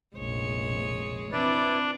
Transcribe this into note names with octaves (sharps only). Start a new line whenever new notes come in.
F1 A#1 G#3 C#5
E3 C4 D4 E4 B4 D5